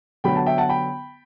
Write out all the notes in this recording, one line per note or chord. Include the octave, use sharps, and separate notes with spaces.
D3 F#3 B3 G5 B5
F#5 A5
E5 G5
F#5 A5
G5 B5